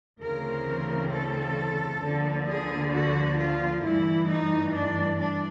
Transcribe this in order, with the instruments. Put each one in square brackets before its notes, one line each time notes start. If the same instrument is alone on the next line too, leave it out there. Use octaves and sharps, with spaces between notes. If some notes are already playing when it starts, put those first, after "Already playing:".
[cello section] D2 C#3 E3 A3 C4 A#4
A4
D2 D3 F3 A#3
G#4
F#4
F4
G2 E3 A3 E4
D#4
D4
D4